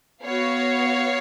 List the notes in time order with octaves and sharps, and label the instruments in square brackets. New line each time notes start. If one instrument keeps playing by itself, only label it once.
[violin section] B3 F#4 C#5 F5